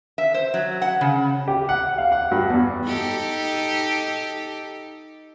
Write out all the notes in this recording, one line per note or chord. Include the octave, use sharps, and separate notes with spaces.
E5
C5
F#3
F#5
C#3
G4
F#5
F5
F#5
G2
E2
D#4 G4 A4